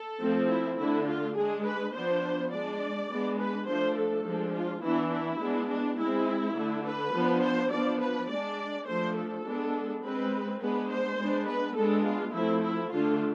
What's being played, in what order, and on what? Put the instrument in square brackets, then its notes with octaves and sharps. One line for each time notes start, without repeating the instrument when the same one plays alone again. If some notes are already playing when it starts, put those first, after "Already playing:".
Already playing: [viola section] A4
F3 A3 C4
E4
D3 A3 D4 E4
F4
G#3 D4 G#4
B4
F3 B3 D4 C5
G#3 D4 D5
G#3 B3 D4
B4
F3 A3 D4 C5
A4
F3 G#3 D4
F4
E3 B3 D4 E4
E4
G#3 B3 D4
D4
G#3 C4 E4
D3 A3 D4
B4
F3 B3 D4
C5
F3 B3 D4 D5
B4
G#3 D4 D5
F3 A3 D4 C5
A4
G#3 B3 D4
G#3 C4 B4
G#3 B3 D4 B4
C5
G#3 B3 D4
B4
G#3 B3 D4 A4
F4
F3 A3 C4 E4
E4
D3 A3 D4 F4